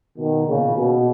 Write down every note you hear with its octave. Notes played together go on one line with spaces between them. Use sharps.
B2 D#3
A#2 C#3
B2